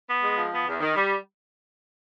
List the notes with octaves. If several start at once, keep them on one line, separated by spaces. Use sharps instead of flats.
B3
G#3
F3
B3
E2
D#3
G3